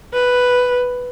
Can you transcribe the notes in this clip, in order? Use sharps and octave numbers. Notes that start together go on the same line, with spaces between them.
B4